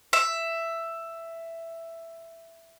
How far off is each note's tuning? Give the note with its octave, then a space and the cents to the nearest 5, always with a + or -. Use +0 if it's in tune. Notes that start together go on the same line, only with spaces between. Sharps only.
E5 +10